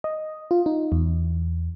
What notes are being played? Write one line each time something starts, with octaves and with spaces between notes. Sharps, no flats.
D#5
F4
D#4
E2